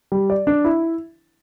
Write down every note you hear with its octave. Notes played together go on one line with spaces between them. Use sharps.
G3
D5
D4
E4